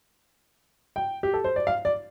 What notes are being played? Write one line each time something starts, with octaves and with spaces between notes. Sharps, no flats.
G5
G4
A4
C5
D5
F5
D5